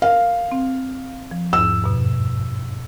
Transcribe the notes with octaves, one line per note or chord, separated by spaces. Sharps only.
A#4 F5
C4
F3
E2 G#2 E6
G2 B2